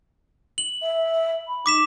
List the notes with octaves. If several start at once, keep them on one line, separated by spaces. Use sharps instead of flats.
F#7
E5
B5
D#4 D6 B6 E7